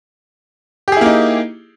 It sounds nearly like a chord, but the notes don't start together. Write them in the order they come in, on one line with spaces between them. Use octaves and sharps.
G4 G#4 E4 A#3 D#4